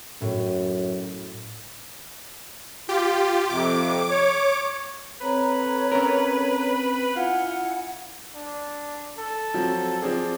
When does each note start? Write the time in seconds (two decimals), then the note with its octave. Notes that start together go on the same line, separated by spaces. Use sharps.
0.21 F#2 A2
2.89 F4 G4
3.50 F2 C3 D6
4.10 C#5
5.21 C4 A4 B4 C#5 A#5
5.92 C#4 A#4
7.16 E4 F4 F#5 G#5
8.35 D4
9.18 A4
9.54 F3 F#3 C4
10.02 F3 C4 G#4 D5